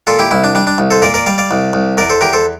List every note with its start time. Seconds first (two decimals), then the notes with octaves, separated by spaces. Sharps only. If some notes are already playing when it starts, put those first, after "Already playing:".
0.07 A#2 F4 A4
0.19 E4 G4
0.31 C2 E4
0.44 D4
0.55 G3 D4
0.67 D4
0.78 C2
0.91 A4 C5
1.02 A#2 A#4 D5
1.14 A#4 D5
1.26 G3 D5 F5
1.38 D5 F5
1.51 C2
1.73 C2
1.97 E2 A#4 D5
2.10 A4 C5
2.21 E2 G4 A#4
2.33 A4 C5